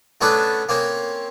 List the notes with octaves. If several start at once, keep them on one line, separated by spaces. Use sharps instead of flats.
A3 B3 C#4 D4 A4 B4
A#3 C4 C#4